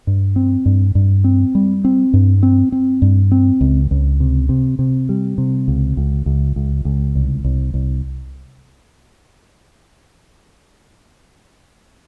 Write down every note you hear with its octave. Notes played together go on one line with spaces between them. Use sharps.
G2
C4
G2
G2
C4
G3
C4
G2
C4
C4
G2
C4
C#2
C#2
C3
C3
C3
G3
C3
C#2
C#2
C#2
C#2
C#2
C2
C2
C2